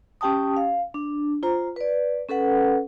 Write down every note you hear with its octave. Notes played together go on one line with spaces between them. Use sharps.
C#4 G4 G5 A5 D#6
F5
D4
F4 C5 A#5
B4 D5
C#4 A4 B4 F#5